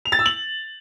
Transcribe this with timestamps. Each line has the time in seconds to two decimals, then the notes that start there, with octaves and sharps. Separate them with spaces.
0.05 F7
0.12 A6
0.19 E6
0.26 F#7